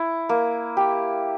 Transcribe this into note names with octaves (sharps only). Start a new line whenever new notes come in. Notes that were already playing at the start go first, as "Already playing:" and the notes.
Already playing: E4
A#3
G4